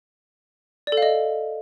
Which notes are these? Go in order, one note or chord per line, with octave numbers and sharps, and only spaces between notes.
D5
A4
F5
D#5